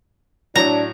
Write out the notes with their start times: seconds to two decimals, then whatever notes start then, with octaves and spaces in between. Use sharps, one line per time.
0.56 A2 F#3 D4 C#5 A#5